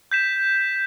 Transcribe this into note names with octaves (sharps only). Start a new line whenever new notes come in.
G6 B6 E7